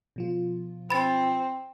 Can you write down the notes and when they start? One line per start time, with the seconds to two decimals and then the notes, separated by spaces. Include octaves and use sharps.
0.16 B2 F3 F4
0.90 C4 B5 A6